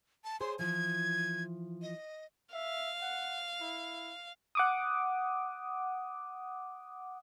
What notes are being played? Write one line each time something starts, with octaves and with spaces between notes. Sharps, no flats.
A5
G#4 C5 C#5 C6
E3 F3 G#6
D#5
E5 F5
F#5
E4
F#5 D6 D#6